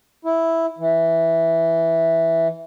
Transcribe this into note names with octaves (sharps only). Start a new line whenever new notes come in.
E4
E3